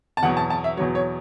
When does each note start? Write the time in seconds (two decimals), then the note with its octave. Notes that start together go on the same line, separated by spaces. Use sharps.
0.17 A5
0.23 E2 B2 F#3 F#5
0.37 A5
0.50 A5
0.64 E5
0.77 E2 B2 F#3 C#5
0.95 C#5